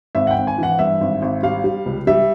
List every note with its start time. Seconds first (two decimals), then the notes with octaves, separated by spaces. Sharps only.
0.15 G#1 E5
0.27 F#5
0.31 G5
0.36 G#1
0.47 G#5
0.58 E3 F#5
0.79 G2 E5
1.01 G#1
1.22 G#1
1.43 G3 F5
1.64 G3
1.86 C#2
2.07 G3 E5